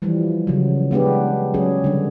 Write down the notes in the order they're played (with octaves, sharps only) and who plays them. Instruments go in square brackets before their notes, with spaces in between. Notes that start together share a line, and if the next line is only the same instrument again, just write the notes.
[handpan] E3 F3 G3
C#3 F#3
G#3 B3 D4 G4
F#3 C#4 G#4
D3 G3